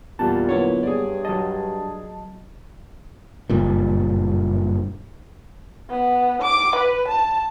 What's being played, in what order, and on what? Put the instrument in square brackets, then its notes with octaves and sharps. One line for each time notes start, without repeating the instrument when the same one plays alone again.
[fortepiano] E2 G3 [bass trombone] A#2 [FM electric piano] A5
[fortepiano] D3 E4 [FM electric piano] F#3 A#3 B3 [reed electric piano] C#5
[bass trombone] G2 [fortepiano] G#4 D5
[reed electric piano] F#3 D#5 [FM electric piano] A5
[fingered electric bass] F#1 G2 A#2
[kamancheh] B3
D6
B4
A5